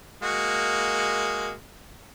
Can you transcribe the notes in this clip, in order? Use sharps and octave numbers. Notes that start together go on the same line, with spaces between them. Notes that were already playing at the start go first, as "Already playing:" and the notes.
G#3 A#3 F#4